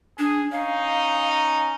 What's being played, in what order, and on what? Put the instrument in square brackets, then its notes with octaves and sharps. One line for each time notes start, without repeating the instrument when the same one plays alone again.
[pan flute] D4 [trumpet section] G#4
[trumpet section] C#4 D#4 [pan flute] F5